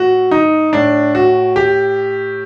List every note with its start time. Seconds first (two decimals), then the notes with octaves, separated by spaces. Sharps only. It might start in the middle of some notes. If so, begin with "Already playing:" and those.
Already playing: A2 F#4
0.31 D#4
0.73 A2 D4
1.15 F#4
1.56 G4